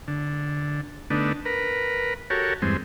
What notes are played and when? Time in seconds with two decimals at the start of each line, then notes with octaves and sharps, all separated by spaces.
0.08 D3
1.10 D3 A3 B3 D4 D#4
1.45 A#4 B4
2.30 F#4 G4 A4 A#4 C#5
2.62 E2 G2 G#3 C4